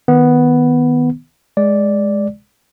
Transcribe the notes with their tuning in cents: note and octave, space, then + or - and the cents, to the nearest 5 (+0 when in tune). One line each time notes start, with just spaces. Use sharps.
D#3 +5 B3 +0
G#3 +0 D5 -5